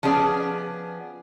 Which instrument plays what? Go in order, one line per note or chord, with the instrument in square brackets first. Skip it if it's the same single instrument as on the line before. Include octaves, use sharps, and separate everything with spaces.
[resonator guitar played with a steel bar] F3 B3 C#4 G#4 D5